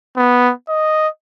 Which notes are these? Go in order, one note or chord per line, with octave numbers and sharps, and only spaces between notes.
B3
D#5